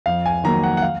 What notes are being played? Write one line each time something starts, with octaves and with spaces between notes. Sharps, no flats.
F2 F5
G#5
D#3 F#3 A#3 A#5
F#5
F#5
F5